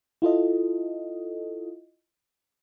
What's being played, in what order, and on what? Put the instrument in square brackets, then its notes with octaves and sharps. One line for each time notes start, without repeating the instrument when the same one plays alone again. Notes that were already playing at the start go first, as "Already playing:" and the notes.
[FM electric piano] E4 F4 A4 D#5